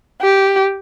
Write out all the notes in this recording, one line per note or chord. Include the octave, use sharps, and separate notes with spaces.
G4